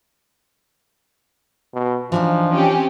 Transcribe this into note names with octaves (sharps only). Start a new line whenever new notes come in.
B2
E3 F3 D4 D#4
C4 C#4 G4